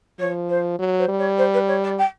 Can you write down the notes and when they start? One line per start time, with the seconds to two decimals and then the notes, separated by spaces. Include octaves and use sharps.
0.19 F3 C#5
0.49 C5
0.79 F#3
0.98 C5
1.08 G3
1.18 C#5
1.38 C5
1.53 B4
1.67 C#5
1.83 D5
1.98 G5